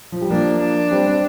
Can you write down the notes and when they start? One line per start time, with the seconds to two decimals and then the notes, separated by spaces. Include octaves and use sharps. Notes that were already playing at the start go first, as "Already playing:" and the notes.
0.12 F3
0.21 G3
0.30 F3 A#3 D4
0.60 D4
0.91 G3 C4
1.06 G3 C4